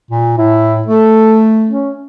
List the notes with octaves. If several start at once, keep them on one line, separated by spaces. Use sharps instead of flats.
A#2
A2 E4
A3 A4
C#4